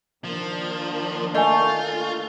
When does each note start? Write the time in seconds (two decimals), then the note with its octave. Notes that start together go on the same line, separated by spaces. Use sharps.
0.25 D#3 F3 A#3 D4
1.35 A3 F4 D#5 G#5